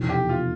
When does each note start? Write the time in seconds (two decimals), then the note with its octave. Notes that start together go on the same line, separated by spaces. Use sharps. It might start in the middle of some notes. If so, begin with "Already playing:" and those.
Already playing: F1 E2 B2
0.09 G4
0.29 F4